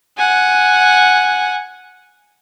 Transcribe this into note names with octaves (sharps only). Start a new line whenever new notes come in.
F#5 G#5